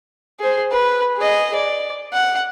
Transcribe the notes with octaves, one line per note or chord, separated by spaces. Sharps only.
G#4 C5
B4
G#4 D#5
D5
F#5